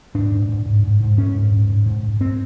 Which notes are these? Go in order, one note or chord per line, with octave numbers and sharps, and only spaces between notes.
G#2 D4
G#2
G#2
G#2
G#2
G#2
G#2 C#4
G#2
G#2
G#2
G#2
G#2
G2 C4